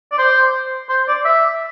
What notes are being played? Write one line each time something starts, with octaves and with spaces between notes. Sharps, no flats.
D5
C5
C5
D5
E5